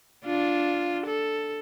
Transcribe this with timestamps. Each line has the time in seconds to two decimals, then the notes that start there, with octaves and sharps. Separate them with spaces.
0.25 D4 F4
1.06 A4